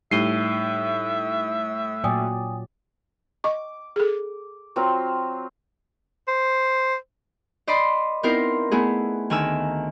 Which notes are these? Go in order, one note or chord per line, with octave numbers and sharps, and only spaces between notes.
A2 G3 D#4 E5 C7 D#7 G7
A#2 F#3 D5 G5 G#5 D#6
D#5 C#6 D6
G#4 A4
F#3 C4 F4
C5
C5 D5 D#5 B5 C6
B3 C4 D#4 E4 A#4 C5
A3 B3 E4 G#4
D2 D#3 G#5 A#5 E6